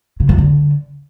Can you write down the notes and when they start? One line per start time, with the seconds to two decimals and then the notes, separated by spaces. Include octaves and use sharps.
0.20 C#3
0.29 E2
0.38 D3